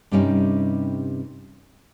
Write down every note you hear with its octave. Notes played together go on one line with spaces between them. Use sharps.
G2 C3 G3 C#4 D#4